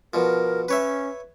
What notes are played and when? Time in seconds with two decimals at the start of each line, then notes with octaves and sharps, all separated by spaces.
0.14 B2 F3 A#4
0.68 C#4 B4 C#5 E5